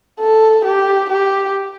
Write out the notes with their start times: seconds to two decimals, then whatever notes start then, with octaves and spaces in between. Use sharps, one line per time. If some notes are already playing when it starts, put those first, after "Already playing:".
0.20 A4
0.65 G4
1.10 G4